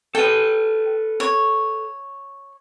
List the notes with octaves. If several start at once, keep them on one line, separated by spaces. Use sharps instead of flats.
A4 B4 G5
C#5